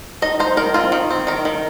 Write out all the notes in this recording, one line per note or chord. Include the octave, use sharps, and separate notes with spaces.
D#4 D#5
D#4 C5
D#3 A#4
C4 F4
D#3
C4
D#3 A#4
D#3